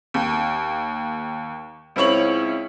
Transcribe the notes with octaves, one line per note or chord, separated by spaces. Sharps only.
D#2
C#2 C4 E4 C#5 F#7